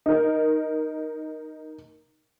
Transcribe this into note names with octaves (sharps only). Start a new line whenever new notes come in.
D#4 A#4